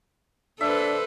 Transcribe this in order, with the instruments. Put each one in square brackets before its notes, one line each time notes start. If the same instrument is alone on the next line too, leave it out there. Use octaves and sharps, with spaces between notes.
[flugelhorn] D4 [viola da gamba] A4 B4 C5 [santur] E5